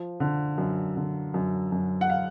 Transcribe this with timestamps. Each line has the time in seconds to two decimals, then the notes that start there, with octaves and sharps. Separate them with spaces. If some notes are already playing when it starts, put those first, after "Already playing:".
Already playing: F3
0.20 D3
0.58 F#2
0.96 D3
1.34 F#2
1.72 F#2
2.01 F#5
2.10 F5